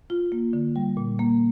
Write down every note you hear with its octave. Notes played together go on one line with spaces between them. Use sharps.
F4
A#3
D3
G3
A#2
A#3